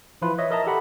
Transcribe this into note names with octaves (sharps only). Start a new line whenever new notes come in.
E3 F3 E4 F4 B4
C#5 D#5 E5
A#4 D#5 E5 A5 A#5
G4 A4 F#5 B5